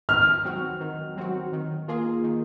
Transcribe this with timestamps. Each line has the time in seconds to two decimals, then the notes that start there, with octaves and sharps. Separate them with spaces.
0.09 D#3 F6
0.45 F#3 C4 F#4
0.81 D#3
1.17 F#3 C4 F#4
1.53 D#3
1.88 A#3 F4 G#4
2.24 D#3